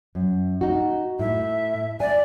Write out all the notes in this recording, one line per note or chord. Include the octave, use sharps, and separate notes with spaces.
F#2
D#4 F#4
A2 E5
D5 G#5